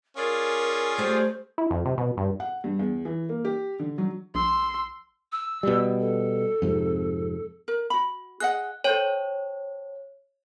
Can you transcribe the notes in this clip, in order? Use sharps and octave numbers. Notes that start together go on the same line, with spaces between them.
C#4 F4 G#4 A#4 D5
A3 G4 C5
E4
F2
C3
B2
G2
F#5
G2
E2
E3
A#3
G4
D3
F#3
A#1 C6 E6
E6
B2 G3
A4
F2 G#2 C3
A#4
F#4 B5
G#4 D#5 F#5 F#6
A4 C5 C#5 G5